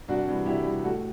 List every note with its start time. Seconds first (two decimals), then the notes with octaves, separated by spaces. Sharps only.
0.08 C2 D4 F#4
0.27 C3 E3 G3
0.45 C2 E4 G4
0.65 C3 E3 G3
0.84 A2 F#4 A4